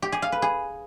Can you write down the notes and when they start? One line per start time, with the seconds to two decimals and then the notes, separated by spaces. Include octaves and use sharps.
0.02 G4
0.12 G#4
0.22 F5
0.32 B4
0.42 G#4